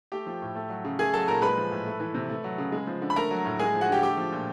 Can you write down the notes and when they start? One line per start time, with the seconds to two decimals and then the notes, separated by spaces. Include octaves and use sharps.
0.12 A3 G4 G5
0.27 F3
0.42 A2
0.55 A3
0.70 F#3
0.85 C#3
0.99 A3 G#4 G#5
1.13 F#3 A4 A5
1.28 A#2 A#4 A#5
1.42 G#3 B4 B5
1.57 F3
1.71 A2
1.86 A3
2.00 E3
2.14 C3
2.30 A3
2.44 F#3
2.58 C#3
2.72 G#3
2.87 F3
3.02 D3
3.10 B5
3.16 A3 A#4 A#5
3.31 F#3
3.45 A2
3.59 G#3 G#4 G#5
3.74 F3
3.81 F#4 F#5
3.89 D3 G4 G5
4.03 A3 G4 G5
4.18 F3
4.32 A#2